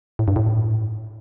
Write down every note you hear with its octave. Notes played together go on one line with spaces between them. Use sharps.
A2
G2
A2